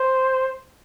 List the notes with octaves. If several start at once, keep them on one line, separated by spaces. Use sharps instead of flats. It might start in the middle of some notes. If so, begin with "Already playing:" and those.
Already playing: C5